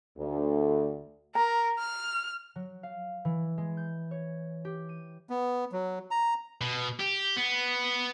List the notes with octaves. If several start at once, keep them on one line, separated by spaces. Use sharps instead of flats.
D2
A#4 A#5
F6
F#3
F5
E3
G#3
G6
C#5
G4
D#7
B3
F#3
A#5
B2
G4
B3